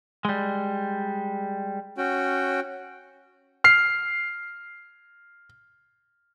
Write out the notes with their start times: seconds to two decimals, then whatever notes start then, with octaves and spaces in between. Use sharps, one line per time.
0.25 G3 G#3
1.97 C#4 F#4 G5
3.64 F6 C7